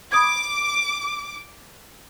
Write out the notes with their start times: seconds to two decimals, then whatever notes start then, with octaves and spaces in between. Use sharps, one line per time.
0.12 B5 D6 D#6 G#6